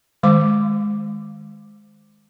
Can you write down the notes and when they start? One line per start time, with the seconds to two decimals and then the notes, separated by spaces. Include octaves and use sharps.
0.23 D#3 G#3 D6